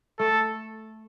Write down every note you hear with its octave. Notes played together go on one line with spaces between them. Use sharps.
A3 A4